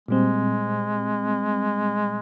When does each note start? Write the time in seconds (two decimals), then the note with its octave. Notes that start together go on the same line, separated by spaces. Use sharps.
0.08 A#2 G3 G#3 C4